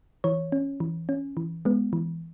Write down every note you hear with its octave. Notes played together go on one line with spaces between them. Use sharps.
E3 C#5
C#4
E3
C#4
E3
G#3 B3
E3